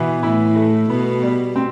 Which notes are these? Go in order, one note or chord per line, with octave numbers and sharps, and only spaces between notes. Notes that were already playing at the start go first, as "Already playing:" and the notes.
Already playing: B2 E3 B3
A2 E4
A3
B2 B3
G3
C4